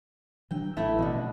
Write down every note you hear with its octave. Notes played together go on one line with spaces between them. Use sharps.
E3 F#3 D4 G5
A1 A3 E4
B2 D3 E3 B3 C#4